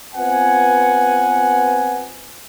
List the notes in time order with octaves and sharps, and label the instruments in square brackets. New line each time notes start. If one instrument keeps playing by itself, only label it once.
[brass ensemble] B3 C4 F4 B4 F#5 G#5